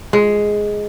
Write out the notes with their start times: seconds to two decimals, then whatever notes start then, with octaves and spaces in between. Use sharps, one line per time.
0.13 G#3